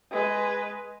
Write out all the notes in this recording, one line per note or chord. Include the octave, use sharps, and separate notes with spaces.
G#3 B4